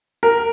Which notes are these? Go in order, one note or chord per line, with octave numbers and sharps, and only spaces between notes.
A#4